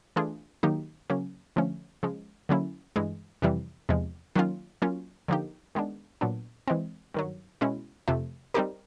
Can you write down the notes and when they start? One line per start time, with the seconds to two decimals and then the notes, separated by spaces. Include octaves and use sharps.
0.16 E3 A3 D4 F4 G#4
0.63 D#3 F#3 A#3 D#4 G4
1.10 C#3 F#3 A#3 C#4
1.56 D3 F3 A3 C#4
2.03 C#3 F3 G#3
2.49 D3 F#3 A#3 C#4 E4
2.96 G2 E3 G#3
3.42 F2 C3 E3 G3
3.89 E2 C3 F3 G#3
4.35 D#3 F#3 A#3 C#4 F4
4.82 F#3 A#3 C#4 F4
5.28 D3 F3 A#3 D#4 G4
5.75 D#3 G#3 B3 D4
6.21 A#2 F#3 B3 D4
6.68 E3 G#3 C4
7.14 G2 D#3 F#3
7.61 B2 G#3 C#4 E4
8.08 F2 C3 F3 A3
8.54 G3 C4 D#4 G4 A#4